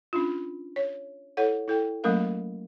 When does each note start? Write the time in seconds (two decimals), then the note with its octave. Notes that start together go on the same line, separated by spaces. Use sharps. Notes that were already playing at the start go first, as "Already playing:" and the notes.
0.13 C#4 D4 F4
0.76 C#5
1.37 E4 A4 C#5 F#5
1.68 E4 A4 G5
2.04 F#3 A3 A#3 C#4 A#4 F5